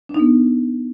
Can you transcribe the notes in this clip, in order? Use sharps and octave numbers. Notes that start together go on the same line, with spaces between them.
D4
D#4
B3